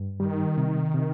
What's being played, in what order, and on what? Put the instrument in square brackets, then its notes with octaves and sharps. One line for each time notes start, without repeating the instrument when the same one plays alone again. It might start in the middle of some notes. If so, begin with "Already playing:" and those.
Already playing: [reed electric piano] G2
[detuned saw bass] D#3 [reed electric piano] G3
[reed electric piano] C3
C3